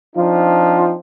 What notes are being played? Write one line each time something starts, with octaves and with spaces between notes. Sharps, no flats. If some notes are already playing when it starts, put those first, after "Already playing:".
F3 C4 D4 D#4 F4